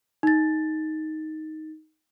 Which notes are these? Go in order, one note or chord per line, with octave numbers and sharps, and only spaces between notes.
D#4 A6